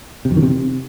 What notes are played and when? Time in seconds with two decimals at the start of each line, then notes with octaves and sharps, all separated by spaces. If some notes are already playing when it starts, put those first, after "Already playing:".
0.25 C3
0.31 F2
0.37 D#3
0.42 C3